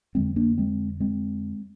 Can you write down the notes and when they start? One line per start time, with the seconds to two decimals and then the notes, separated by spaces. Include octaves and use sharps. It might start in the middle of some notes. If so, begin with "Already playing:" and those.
0.15 F2 D3 G#3 C4
0.36 A#3 D4
0.58 G#3 C4
1.00 G#3 C4